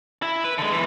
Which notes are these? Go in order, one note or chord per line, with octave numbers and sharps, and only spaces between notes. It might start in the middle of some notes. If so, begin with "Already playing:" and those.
E4
B4
D3 G#3
B1 E3